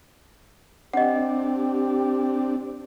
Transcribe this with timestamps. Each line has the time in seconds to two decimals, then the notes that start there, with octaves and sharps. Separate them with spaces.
0.93 C4 D4 G4 D#5 F#5